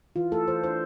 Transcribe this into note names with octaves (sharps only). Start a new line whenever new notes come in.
E3 F4
A3 A4
E3 C5
D4 C5